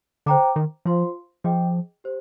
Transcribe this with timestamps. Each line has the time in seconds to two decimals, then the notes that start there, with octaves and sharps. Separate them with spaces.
0.26 D3 C5 G5 A#5 D6
0.56 D#3
0.85 F3 F4 C5 F5 C6
1.44 F3 G#4 D#5 G5 D6
2.04 G4 C5